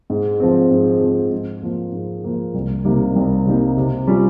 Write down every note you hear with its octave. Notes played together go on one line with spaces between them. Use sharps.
G#2
F3 C4
G#2
F3 C4
G#2
F3 A#3
G#2
F3 A#3
C2
C3 G3 A#3 D#4
C2
C3 G3 A#3 D#4
C3
G3 C#4 F4